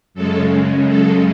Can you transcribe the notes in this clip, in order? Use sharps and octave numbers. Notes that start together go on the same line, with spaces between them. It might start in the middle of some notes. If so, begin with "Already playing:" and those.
F#2 C#3 G#3 A4
A4